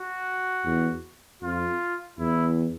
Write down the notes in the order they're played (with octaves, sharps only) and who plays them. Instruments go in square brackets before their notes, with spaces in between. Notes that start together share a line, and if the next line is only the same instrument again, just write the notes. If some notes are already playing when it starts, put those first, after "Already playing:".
Already playing: [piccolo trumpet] F#4
[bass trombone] E2
[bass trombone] F2 [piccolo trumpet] F4
[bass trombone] E2 [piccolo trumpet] E4